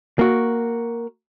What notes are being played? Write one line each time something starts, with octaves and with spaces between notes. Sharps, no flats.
A#3 F#4